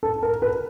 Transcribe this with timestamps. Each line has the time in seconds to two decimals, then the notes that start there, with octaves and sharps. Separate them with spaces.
0.03 A4
0.23 A#4
0.42 B4